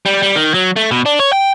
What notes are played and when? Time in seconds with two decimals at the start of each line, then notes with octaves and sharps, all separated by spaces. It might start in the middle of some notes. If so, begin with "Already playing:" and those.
0.06 G3
0.23 G3
0.36 D#3
0.54 F#3
0.76 A3
0.91 B2
1.06 D4
1.19 C#5
1.33 G5